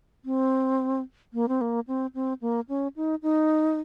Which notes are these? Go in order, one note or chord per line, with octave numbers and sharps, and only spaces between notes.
C4
A#3
C4
A#3
C4
C4
A#3
C#4
D#4
D#4